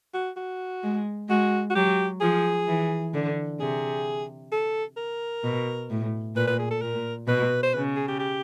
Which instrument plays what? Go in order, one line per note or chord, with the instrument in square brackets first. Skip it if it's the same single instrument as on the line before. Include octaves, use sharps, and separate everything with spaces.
[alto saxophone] F#4
F#4
[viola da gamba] G#3
[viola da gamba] G#3 [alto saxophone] F#4
[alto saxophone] F#4
[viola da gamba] F#3 [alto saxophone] G4
[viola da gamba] F3 [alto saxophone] G#4
[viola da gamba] E3
D3
[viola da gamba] C3 [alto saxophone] G#4
[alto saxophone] A4
A#4
[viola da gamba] B2
A2
[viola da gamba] A#2 [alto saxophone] B4
[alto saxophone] B4
G#4
A4
[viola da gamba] A#2 [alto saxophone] A#4
[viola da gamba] B2 [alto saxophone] B4
[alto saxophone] C5
[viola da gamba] C#3 [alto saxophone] B4
[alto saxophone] G#4
G4
G4